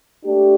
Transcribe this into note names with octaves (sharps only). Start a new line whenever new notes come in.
A3 D4 G4